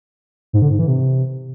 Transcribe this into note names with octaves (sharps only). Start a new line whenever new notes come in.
G#2
D3
G#2
E3
C3